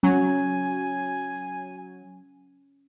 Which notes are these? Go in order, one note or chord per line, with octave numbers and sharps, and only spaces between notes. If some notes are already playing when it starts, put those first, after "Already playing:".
F#3 C#4 G#5